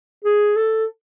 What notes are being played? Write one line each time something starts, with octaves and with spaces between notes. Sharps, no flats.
G#4
A4